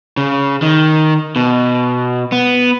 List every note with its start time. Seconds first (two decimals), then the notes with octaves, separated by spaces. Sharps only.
0.17 C#3
0.62 D#3
1.36 B2
2.32 B3